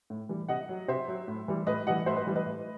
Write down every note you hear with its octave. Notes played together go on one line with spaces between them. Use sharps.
A2
E3 G3
C3 D#5 F#5
F#3
C3 C5 E5
F#3
A2
E3 G3
A2 B4 D#5
E3 G3 D#5 F#5
A2 C5 E5
B4 D#5
E3 G3
B4 D#5
A2